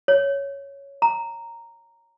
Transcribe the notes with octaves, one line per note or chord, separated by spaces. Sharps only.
C#5
A#5